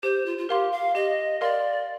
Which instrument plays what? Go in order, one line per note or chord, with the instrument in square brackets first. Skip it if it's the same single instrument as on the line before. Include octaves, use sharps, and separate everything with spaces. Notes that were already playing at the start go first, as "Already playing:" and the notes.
[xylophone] G4 [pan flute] C5
[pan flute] F4
F4
[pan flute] G4 [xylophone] A#4 F5 C6
[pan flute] F5
[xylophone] G4 [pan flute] D#5
[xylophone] A#4 F5 C6 [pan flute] D5